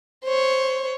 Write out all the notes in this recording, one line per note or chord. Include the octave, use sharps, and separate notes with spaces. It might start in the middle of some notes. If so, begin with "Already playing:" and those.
C5 C#5